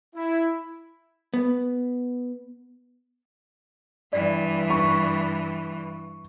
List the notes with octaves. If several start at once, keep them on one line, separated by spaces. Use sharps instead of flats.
E4
B3
G2 E3 D5 G5
C#6